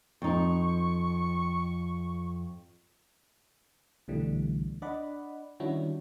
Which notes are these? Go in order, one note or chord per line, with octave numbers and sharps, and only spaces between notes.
F2 D#4 C#6
C2 B2 D3 E3 G3 A3
D4 D5 D#5 F#5 B5
D#3 G3 C#4 D4 E4 F#4